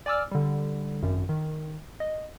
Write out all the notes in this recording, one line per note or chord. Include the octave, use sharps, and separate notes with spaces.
D5 G#5 D6 E6 F6
D3 G3
G#1 F#2
D#3
D#5